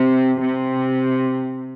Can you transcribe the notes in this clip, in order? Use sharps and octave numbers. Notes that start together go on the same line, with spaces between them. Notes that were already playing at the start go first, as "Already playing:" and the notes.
Already playing: C3
C3